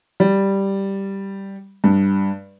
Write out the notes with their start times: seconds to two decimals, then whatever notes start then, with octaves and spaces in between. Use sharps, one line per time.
0.20 G3
1.84 G2